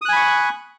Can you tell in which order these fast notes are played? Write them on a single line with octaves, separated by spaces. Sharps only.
D#6 F#6 G#5 B5 C#6